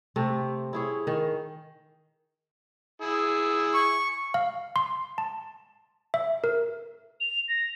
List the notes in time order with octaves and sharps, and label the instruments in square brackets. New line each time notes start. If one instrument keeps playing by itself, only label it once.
[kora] C3 A3 C4
E4 G#4 C#5
D#3
[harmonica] E4 G#4
[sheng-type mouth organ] C#6
[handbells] F5
C6
A5
E5
A#4
[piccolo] F7
A#6